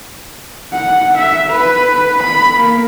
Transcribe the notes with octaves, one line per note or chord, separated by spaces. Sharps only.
F#5
E5
B4
B5
A#3